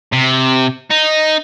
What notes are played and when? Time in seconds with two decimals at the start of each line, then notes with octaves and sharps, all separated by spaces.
0.12 C3
0.90 D#4